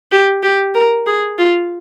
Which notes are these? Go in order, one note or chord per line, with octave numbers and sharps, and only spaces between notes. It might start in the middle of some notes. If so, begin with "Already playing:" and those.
G4
G4
A#4
G#4
F4